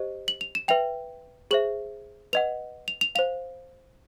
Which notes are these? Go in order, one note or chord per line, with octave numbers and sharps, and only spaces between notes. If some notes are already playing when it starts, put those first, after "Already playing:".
Already playing: G4 C5 D#5
F#7
F7
E7
B4 E5 G5 F7
G#4 C5 E5 F#7
B4 D#5 F#5 F7
F7
F7
C5 F5 F7